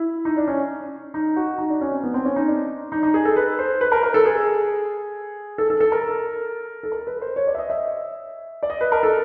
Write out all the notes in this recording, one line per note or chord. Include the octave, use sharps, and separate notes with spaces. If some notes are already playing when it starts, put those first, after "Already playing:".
Already playing: E4
D#4
D4
C#4
D#4
F#4
D#4
D4
C#4
C4
B3
C4
C#4
D#4
D4
D#4
D#4
G#4
A4
B4
C5
B4
A#4
A#4
A4
G#4
A4
A4
A4
A#4
A4
A#4
B4
C5
C#5
D5
E5
D#5
E5
D5
D#5
B4
A#4
A4